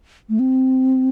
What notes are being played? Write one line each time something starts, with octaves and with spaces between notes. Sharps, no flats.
A3
C4